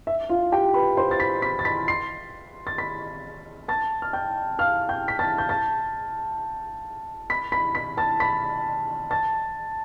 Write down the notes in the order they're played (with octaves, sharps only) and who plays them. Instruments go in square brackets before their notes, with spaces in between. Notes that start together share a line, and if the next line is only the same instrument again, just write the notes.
[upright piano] E5
F4 F5
G4 G5
B4 B5
C5 C6
A6
B5 B6
B5 B6
A6
B5 B6
C6 C7
A6
B5 B6
A5 A6
F6
G5 G6
F5 F6
G5 G6
B6
A5 A6
G6
A5 A6
B5 B6
B5 B6
B5 B6
A5 A6
B5 B6
A5 A6